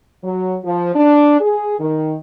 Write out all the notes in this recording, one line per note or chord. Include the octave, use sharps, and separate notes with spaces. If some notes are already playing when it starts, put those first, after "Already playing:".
F#3
F3
D4
G#4
D#3